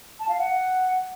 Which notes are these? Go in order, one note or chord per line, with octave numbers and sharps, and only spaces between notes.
A5
F5
F#5